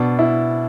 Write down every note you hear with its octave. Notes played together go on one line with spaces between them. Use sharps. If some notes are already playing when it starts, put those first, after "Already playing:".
Already playing: B2 D4
E4